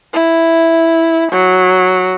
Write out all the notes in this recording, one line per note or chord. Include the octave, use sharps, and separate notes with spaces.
E4
F#3